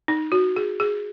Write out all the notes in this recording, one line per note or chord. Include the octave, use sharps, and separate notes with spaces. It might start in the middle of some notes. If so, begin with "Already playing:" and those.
D#4
F#4
G#4
G#4